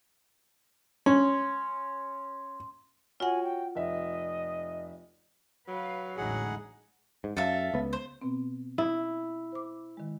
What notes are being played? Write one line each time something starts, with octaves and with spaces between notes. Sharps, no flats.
C#4 C6
F4 F#4 C#5 F#5 G#5
G5
F1 D#5 E5
F#3 B4 F5
A1 E2 D3 G#3 D#4 E4 G#4 F#5
G#2
F#2 A4 E5 F5
C#2 B3
C5
B2 B3 C4
E4 D#6
C5 D6
D#3 G#3